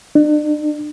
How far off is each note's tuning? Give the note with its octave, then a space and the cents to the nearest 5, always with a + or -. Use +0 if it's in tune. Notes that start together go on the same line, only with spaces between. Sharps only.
D4 +40